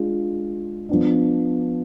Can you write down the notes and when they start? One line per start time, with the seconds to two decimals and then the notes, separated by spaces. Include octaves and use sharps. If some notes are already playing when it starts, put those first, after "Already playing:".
Already playing: G#3 D4 F4
0.89 F3 B3 D4